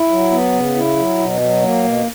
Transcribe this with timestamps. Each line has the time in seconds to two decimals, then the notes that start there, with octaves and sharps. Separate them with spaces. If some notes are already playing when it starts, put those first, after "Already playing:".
Already playing: E4
0.10 F#3
0.31 B3
0.53 C#3
0.75 E4
0.97 F#3
1.18 B2
1.41 F#3
1.62 A#3
1.84 B2